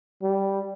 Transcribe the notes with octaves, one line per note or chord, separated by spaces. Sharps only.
G3